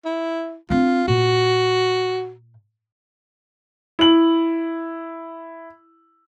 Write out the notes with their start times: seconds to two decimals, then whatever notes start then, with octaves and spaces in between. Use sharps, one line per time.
0.05 E4
0.70 C4 D4 F4
1.08 A#2 F#4
3.99 E4 F#7